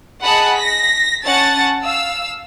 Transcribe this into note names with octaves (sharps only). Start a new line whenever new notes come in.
G#4 D#5 F#5 A5 B5
A#6 B6
C#4 F#5 A5 A6
F5 E6